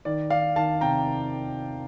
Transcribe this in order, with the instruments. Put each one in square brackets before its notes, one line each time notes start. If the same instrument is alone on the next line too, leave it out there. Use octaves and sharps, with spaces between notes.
[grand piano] D#3 D5
D#3 D5 F5
D#3 F5 A5
C3 G5 A#5